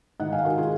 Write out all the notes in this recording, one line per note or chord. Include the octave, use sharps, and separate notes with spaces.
G#2 D#3 D#5 F#5
F5 G#5
F#4 A#4
F4 G#4